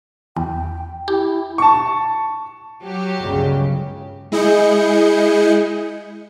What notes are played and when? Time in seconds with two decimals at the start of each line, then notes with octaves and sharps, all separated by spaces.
0.37 E2 G5
1.08 E4 G4
1.58 A5 C#6
2.83 F#3 G4
3.22 G1 C#2 C#3
4.32 G#3 E4 G#4 D#5 G6 C#7